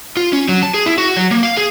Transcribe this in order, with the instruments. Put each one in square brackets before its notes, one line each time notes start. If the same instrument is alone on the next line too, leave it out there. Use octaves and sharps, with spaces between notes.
[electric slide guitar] F4
C#4
F#3
A5
G#4
E4
F#4
F#3
A#3
F5
G#4